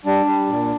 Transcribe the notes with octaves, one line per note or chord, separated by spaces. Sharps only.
G3 D4
G3
A#2